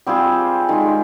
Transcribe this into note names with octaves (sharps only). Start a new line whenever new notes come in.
G3 C4 F4 G#4
D#3 G#3 D#4 G#4